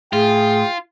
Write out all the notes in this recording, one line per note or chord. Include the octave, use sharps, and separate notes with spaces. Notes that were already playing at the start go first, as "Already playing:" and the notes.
A2 F4 G#4 G5